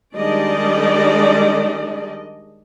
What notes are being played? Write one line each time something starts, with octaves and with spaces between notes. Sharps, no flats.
D#3 G3 G#3 D4 D5 D#5